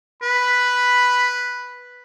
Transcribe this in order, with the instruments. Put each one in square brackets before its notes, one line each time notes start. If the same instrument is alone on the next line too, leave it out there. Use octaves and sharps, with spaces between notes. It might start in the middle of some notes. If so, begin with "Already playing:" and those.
[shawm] B4 [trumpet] B5